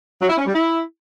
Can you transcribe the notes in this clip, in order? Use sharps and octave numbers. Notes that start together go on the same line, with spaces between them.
F#3
E4
C#4
G3
E4